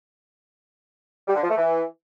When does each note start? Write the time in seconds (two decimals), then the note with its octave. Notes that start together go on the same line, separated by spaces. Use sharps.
1.28 G3
1.35 D3
1.42 F3
1.50 A3
1.57 E3